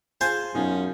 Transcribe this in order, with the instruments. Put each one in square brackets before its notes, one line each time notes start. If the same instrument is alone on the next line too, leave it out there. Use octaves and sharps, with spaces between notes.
[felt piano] F4 G#4 [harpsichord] C5 G#5 A5
[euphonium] F#2 [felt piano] B2 D#4 F4 [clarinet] C#4